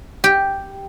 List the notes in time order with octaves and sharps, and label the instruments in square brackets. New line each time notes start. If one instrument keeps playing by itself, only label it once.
[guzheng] G4